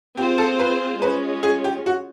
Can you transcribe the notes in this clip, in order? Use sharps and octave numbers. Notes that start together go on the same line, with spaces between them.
C4 F4 G4 G#4 C5
A4
B4
G#3 C#4 F4 B4
G#4
G4
F#4